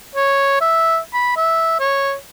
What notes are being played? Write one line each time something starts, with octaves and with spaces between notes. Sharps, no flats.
C#5
E5
B5
E5
C#5